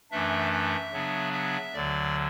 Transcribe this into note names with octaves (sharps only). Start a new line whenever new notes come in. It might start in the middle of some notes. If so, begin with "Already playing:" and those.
F#2 E3 A3 D4 E5
E5
C#3 F#3 B3 D4
E5
D2 D3 F#3 D5